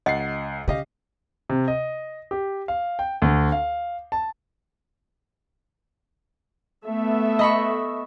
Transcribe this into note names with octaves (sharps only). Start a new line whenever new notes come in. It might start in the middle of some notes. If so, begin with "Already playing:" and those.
C#2 D#5 F#5 C7
C#3 G4 D#5 F5
C3
D#5
G4
F5
G5
D2
F5
A5
A3 B3 E5
D#5 B5 C#6